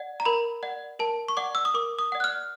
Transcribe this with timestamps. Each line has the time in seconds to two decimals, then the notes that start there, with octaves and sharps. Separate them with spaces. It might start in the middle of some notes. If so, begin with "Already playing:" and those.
Already playing: D5 F#5
0.20 A#5
0.25 A#4 B5
0.63 D5 F#5
0.99 A#4 A5
1.28 C#6
1.37 D5 F#5 D6
1.55 E6
1.65 D#6
1.74 A#4 D6
1.99 D#6
2.12 D5 F#5
2.20 F#6
2.24 F6